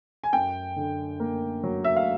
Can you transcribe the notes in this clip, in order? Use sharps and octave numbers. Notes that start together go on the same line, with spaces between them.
G#5
F#2 G5
D3
A#3
F#3
E5
F5